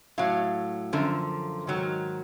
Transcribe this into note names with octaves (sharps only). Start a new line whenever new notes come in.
A2 F#3 F5
F#2 D3 F3
G#2 D#3 F#3